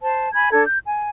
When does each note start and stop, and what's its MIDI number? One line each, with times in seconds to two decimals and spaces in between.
0.02 0.28 72
0.02 0.28 81
0.33 0.51 80
0.33 0.51 83
0.33 0.51 92
0.51 0.64 62
0.51 0.64 69
0.51 0.64 92
0.65 0.78 91
0.86 1.10 80